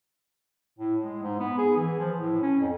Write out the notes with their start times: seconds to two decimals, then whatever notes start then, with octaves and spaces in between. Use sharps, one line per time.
0.78 A2
1.03 G#3
1.23 G#2
1.39 B3
1.58 G#4
1.76 E3
1.99 F3
2.17 A2
2.42 C#4
2.60 F2